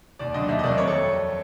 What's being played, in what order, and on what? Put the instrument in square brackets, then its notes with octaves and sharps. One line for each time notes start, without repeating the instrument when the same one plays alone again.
[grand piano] D#2 D5
D3 F#3 D#5
D#2 E5
D#5
D#3 F#3 A#3 D5
F2 C#5
A4